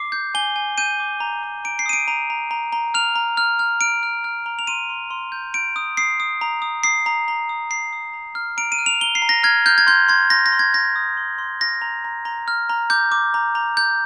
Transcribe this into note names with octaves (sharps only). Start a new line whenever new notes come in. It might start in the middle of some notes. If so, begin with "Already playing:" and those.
Already playing: D6 C7
G6
G#5 G7
G#5
G6 D#7
D6
A#5
A#5
A#5 D7
C7
D#6 D#7
D7
A#5 D#7
A#5
A#5
A#5
F6 F7
A#5
F6
F6
F6 D7
F6
F6
A#5
F7
C6 D#7
C6
C6
G6
G6 D7
D#6
D#6 C7
D#6
A#5
D#6
D#6 C7
A#5
A#5
D#6
A#5 C7
D#6
A#5
F6
A#5 D7
D#7
F6
F7
A#5 G7
C7
A#5
A#6
F6 G#6
F6 G6
G#6
C6 G6
C6 G#6
C6 A#6
A#6
C6
G#6
G6 A#6
D#6
C6
C6
F6 A#6
A#5
A#5
A#5
F6
A#5
D6 G6
D6
A#5
A#5
A#5 G6